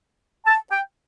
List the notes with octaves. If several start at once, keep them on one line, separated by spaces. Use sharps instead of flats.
A5
G5